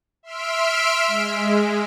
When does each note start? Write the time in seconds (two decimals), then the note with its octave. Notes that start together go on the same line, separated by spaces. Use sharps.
0.23 E5 C6 E6 F6 B6 D7
1.08 G#3